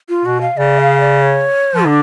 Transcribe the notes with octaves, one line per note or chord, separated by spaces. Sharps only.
F4
B2 F#4
F5
C#3 D5
F5
D5
C#5
F3
D3 D4